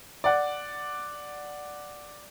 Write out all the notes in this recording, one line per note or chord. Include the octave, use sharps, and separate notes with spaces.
D5 F#5